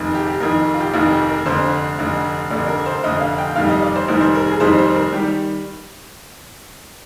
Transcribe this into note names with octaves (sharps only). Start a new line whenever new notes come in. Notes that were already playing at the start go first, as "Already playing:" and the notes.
Already playing: F1 F2 D#3
G4
G4
F1 F2 D#3 A#4
F4
G4
F1 F2 D#3 F4
G4
A#4
F1 F2 D3 C5
F1 F2 D3
F1 F2 D3 D5
A#4
C5
F1 F2 D3 D#5
F5
G5
F1 F2 D#3 G3 F5
D#5
D5
C5
F1 F2 D#3 G3 A#4
C5
A#4
G#4
F1 F2 D#3 G3 C5
C5
A#4
D#3 G3 G4